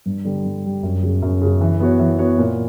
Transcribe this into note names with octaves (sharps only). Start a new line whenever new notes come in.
G2
D3 G3
G2
D3 G3
F#2
C#3 F#3
F#2
C#3 F#3
E3
B3 F#4 C#5
E3
B3 F#4 C#5
A#2